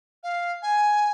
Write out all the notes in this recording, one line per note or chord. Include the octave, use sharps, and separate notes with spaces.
F5
G#5